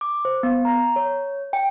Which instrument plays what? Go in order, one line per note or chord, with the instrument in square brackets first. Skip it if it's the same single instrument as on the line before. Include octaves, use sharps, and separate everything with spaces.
[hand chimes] D6
C5
B3
A#5
C#5
G5